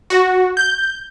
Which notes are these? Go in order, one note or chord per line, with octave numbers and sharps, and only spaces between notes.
F#4
G6